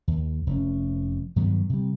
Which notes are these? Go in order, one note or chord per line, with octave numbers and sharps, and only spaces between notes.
D#2
F1 C4 C#4
G2 D#3 F#3 B3
C3 G3